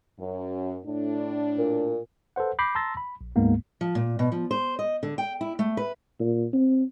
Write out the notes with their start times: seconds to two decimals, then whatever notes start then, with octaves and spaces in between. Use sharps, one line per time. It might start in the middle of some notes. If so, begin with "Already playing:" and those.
0.19 F#2
0.86 A2 D4
1.58 A#2
2.36 A4 B4 C5 F#5
2.59 B5 D6 G6 A#6 C7
2.75 A5 A#5 C6 E6 A6 A#6
2.97 B5
3.21 A#1
3.36 D2 G#2 G#3 A#3 B3
3.81 F3
3.95 A#2
4.19 B2
4.32 F3
4.51 C5
4.79 D#5
5.03 D3
5.18 G5
5.41 E4
5.59 A3
5.77 B4
6.20 A#2
6.53 C4